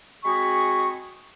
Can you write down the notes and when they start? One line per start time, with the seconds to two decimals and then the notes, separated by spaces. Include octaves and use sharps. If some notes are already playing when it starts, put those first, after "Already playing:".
0.25 G#3 C4 F#4 G#4 B5 C#6